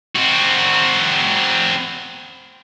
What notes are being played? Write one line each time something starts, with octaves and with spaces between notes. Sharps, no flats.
C4 F#4